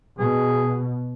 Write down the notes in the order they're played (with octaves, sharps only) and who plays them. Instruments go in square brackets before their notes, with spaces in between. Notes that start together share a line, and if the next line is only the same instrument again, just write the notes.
[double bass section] B2 [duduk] G#4